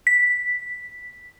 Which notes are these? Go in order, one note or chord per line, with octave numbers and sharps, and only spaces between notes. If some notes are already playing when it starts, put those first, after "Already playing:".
B6